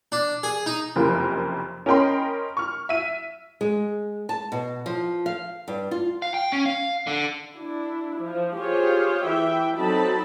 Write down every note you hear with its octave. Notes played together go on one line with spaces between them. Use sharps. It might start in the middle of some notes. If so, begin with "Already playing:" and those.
D4
G#4
D#4
F#1 F2 C3 A#3 A#4
C#4 A#4 D#5 G5 B5 C6
C#6 F6
E5 B6 D#7
G#3
A5
B2
F3
F5
G2
F4
F5
G5
C#4
F5
D3
D4 E4
F3
F4 G4 G#4 C5 C#5
E3 E5 G5
F#3 C4 D#4 A4 A5 B5